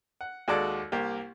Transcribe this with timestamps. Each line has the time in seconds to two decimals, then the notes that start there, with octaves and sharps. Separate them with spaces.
0.21 F#5
0.48 D#2 G#3 F#4 A4 D5
0.92 C2 A#3 G4